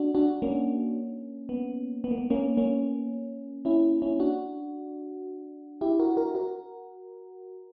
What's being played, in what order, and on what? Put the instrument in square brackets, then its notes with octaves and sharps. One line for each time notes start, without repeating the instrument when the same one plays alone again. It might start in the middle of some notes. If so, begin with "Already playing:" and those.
Already playing: [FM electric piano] D4 F#4
D4 F#4
A#3 C#4
B3
B3
A#3
B3
A#3 C#4
A#3 C#4
C#4 E4
C#4 E4
D4 F#4
E4 G4
F#4 A#4
F#4 A#4
F#4 A#4